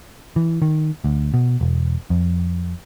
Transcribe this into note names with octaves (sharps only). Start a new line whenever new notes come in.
E3
D#3
D2
B2
E1
F2